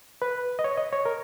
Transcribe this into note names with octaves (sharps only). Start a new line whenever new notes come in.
B4
D#5
C#5
D#5
C#5
A#4